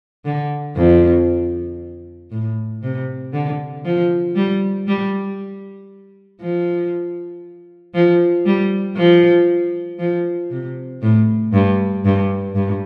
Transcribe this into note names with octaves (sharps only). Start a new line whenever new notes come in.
D3
F2
A2
C3
D3
F3
G3
G3
F3
F3
G3
F3
F3
C3
A2
G2
G2
G2